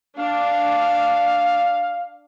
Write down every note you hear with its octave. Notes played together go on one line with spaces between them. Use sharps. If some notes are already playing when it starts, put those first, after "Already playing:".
D4 F5